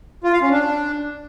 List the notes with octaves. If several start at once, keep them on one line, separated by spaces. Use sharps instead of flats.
F4
F5
C#4
D4